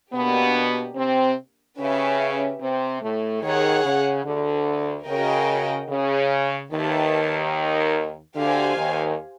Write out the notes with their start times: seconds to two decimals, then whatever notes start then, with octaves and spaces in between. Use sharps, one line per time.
0.13 B2 A#3 B3 D4 G4
0.96 C3 C4
1.78 C#3 C#4 G4 B4 E5
2.60 C3 C4
3.02 A2 A3
3.43 D#2 D#3 G#4 C#5 F#5
3.84 C#3
4.25 D2 D3
5.07 C#3 F#4 A#4 D#5 G5
5.89 C#3
6.72 D#2 D#3 G4 B4 E5 A5
8.36 D2 D3 G4 C5 F5 G#5
8.77 D#2 D#3